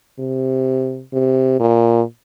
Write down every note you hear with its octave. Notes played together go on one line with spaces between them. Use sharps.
C3
C3
A#2